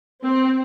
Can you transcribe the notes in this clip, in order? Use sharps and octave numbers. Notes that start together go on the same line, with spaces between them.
C4